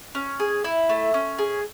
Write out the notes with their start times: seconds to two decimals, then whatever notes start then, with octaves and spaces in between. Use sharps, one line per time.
0.15 C#4
0.40 G#4
0.64 E4
0.89 A3
1.14 C#4
1.38 G#4